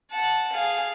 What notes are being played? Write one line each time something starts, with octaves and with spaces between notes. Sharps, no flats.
F#5 A5
G#4 F5